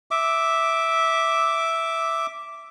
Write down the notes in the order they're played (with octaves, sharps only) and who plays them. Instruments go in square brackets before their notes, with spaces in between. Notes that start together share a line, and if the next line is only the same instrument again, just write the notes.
[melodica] E5 D6